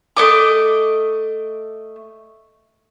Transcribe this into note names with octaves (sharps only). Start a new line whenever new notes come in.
A3 B3 D#5 D6